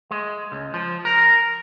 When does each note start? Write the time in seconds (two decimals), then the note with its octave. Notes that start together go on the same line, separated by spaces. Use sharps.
0.11 G#3
0.52 C#2
0.74 F3
1.05 A#4